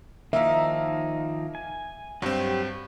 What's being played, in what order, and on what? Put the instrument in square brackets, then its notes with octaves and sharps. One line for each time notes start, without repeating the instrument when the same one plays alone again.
[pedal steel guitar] D#3 F3 D#4 [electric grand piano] A#3 F5 [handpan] E5
[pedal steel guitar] G#5
[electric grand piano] G2 C4 [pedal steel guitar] F#3 G4